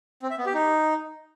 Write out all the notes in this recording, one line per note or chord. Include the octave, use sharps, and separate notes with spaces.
C4
E5
B3
G4
D#4